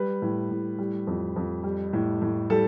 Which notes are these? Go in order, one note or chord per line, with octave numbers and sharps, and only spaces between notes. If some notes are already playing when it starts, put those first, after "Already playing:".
Already playing: G3 B4
A2
A2
G3
F2
F2
G3
A2
A2
G3 A4